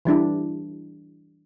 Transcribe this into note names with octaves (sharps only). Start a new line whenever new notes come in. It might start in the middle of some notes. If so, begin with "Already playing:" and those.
E3 G3 D4 E4